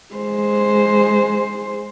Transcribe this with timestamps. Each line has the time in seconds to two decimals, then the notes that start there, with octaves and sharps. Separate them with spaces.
0.15 G#3 C5